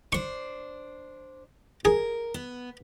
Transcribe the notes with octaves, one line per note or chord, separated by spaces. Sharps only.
D4 C5 C#6
G#4 A#4
B3